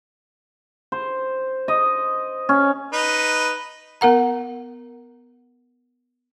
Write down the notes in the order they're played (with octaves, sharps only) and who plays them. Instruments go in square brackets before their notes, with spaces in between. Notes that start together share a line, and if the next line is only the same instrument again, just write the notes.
[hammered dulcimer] C5
D#5
C#4
[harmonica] D#4 B4
[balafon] B3 A#4 F#5 A#5